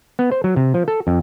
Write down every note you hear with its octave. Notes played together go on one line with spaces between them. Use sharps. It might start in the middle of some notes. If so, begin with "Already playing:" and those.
B3
C5
F#3
C3
F3
A4
F2